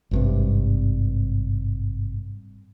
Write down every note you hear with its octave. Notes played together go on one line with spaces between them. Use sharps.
G#1 G2 C3